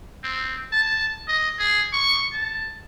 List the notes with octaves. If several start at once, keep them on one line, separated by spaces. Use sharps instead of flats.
C4
A5
D#5
G#4
C#6
A5